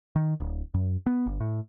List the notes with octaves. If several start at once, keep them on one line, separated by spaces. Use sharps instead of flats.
D#3
D1
F#2
B3
G1
A2